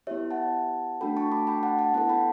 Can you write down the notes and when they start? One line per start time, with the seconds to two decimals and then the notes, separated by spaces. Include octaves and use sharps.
0.07 B3 E4 G4 C#5 E5
0.31 F#5 A5
1.01 A3 D4 F#4 A4 G5 B5
1.17 A5 C#6
1.32 B5 D6
1.47 G5 B5
1.63 F#5 A5
1.78 F#5 A5
1.94 B3 E4 A4 F#5 A5
2.09 G5 B5